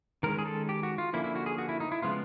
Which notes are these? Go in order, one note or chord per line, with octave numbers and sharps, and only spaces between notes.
D#3 G#3 C#4 A#4
G#4
A4
G4
F#4
F4
D3 F3 A#3 C#4 E4
E4
F#4
G#4
F#4
E4
D#4
E4
C#3 F3 G#3 B3 F4